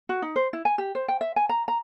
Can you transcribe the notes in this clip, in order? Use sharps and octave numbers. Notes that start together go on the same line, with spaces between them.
F#4
D#4
C5
E4
G#5
G4
C5
G5
E5
G#5
A#5
A#5